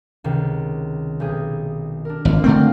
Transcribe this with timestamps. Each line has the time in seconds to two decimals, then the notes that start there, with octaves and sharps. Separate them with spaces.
0.24 C#2 C3 D#3
1.20 B1 G4 G#4
2.05 D4 A#4
2.25 G#1 D3 D4 F4
2.44 D3 A3 C4 F5 G5 A#5